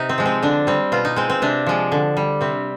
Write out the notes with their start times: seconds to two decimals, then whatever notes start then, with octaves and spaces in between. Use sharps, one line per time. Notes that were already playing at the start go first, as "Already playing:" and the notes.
Already playing: C3 D#4
0.09 C4
0.18 F3 G#3
0.26 C4
0.43 D3 D4
0.67 G3 C4
0.92 B2 F4
1.05 D#4
1.16 G#3 C4
1.30 C4
1.42 C3 D4
1.67 F3 G#3
1.92 D3
2.17 G3
2.41 C3 C4